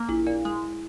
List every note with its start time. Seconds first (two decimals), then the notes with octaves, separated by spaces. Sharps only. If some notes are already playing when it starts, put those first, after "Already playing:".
Already playing: A#3
0.09 A#1 E4
0.27 A#2
0.45 G#3